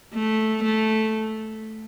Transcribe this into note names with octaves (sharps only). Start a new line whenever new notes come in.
A3
A3